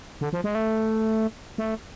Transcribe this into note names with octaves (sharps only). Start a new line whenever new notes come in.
D3
F3
G#3
A3
A3